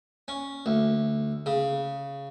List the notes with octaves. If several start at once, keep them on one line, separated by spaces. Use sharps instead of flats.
C#4
D2
C#3